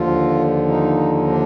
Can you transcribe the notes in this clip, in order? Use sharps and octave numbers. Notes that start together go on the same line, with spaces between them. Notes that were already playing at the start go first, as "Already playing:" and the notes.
Already playing: D#2 D3 F3 F4
D#4
D4